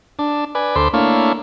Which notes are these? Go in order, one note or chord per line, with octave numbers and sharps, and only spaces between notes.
D4 A5
B4 D5 G#5
D2 A4 C5 B5 C6 D6
A3 A#3 D4 E4 C#5 F5